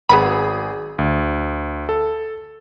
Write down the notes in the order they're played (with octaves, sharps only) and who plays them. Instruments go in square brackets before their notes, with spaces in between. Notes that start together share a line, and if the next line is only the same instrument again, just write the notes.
[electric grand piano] G#1 G#4 [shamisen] F#3 B3 B5
[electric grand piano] D2
A4